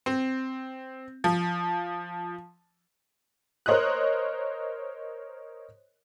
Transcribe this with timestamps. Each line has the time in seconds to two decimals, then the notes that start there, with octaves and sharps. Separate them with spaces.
0.06 C4
1.24 F3
3.66 A#4 C5 C#5 D#5 D#6 F#6